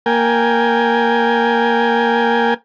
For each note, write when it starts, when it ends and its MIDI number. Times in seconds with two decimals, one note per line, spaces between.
0.06 2.54 58
0.06 2.54 70
0.06 2.54 79
0.06 2.54 80